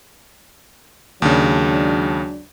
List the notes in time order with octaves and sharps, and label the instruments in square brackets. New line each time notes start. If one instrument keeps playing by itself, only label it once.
[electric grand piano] D#2 C#3 [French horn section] F#3 G#3 D4